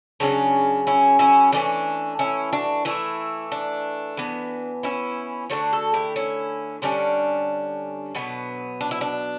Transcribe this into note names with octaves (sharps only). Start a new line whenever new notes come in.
C#3 F#3 A3 C#4 D4
C#4 E4
C#4 E4
E3 A3 C#4 D4
C#4 E4
D4 F#4
E3 A3 C#4 E4
D4
E3 B3
C#4 E4
D3 A3 C#4 D4 F#4
F#4 A4
E4 G4
C#4 E4
D3 G3 C#4 D4
B2 F#3 B3
D4
E4
D4